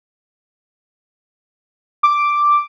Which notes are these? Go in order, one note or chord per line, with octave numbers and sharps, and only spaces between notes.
D6